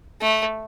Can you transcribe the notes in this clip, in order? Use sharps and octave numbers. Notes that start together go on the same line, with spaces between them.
A3